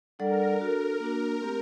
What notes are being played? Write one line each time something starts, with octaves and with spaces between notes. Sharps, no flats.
G3 D4 A4 A#4 D5 F#5
D4 F#4 A4
A#3 D4 F#4
A3 C4 G4 A#4